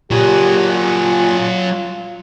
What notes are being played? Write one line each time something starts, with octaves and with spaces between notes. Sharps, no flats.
A#2 F#3 G4 G#4
F4